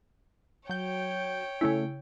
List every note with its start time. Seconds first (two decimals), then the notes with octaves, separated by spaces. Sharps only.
0.69 F#3 C#5 G5 G6
1.61 C#3 A3 C#4 E4